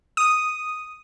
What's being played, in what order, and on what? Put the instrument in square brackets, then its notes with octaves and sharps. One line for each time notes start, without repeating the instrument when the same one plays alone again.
[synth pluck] D#6